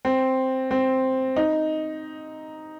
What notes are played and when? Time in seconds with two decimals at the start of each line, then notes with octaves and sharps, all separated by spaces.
0.05 C4
0.71 C4
1.36 D#4